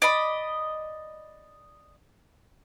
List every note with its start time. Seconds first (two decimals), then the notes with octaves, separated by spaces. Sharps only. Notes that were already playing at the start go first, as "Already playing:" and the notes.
0.02 D5 D#5 B5